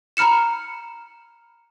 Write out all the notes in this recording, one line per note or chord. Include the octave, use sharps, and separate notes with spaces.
A#5 B5 F6 C#7 E7